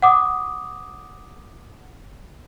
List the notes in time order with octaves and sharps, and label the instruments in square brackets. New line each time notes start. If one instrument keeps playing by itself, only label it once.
[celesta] F#5 D6 D#6